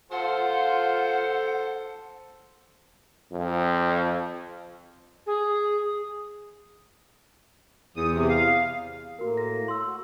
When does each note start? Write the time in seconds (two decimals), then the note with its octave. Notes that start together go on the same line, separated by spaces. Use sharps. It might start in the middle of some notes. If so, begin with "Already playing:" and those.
0.12 F4 A4 C5 F#5
3.32 F2
5.26 G#4
7.96 E2 D#6
8.11 C3
8.29 F5
9.19 A2 A#3 F#4 A#4
9.37 A#6
9.68 C6 E6
9.85 F#4